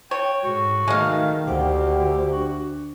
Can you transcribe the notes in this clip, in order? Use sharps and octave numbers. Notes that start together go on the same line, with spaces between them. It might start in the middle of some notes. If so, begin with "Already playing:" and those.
C#5 G5
G#2 F#4
D#3 G#3 A3 F5
D2 G4 C5 F#5 G5
D4 F#4